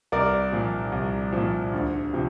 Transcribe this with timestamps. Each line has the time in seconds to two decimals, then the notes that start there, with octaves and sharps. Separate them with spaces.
0.12 C2 A#4 D5
0.52 A#2 F3
0.92 C2
1.32 F3
1.37 A#2
1.73 D2
2.13 C3 F3